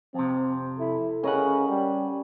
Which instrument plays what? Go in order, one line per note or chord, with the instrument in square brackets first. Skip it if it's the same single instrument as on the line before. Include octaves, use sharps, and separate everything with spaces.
[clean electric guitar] F2 C3 [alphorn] C4
[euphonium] E4 [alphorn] A4
[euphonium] C#3 [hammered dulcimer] C#4 [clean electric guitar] A#4 D#5 F#5
[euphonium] G3